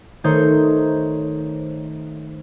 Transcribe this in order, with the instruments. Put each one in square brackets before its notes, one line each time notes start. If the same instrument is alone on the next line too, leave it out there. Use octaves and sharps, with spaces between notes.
[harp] D#3 A3 D#4 C5 C#5 G6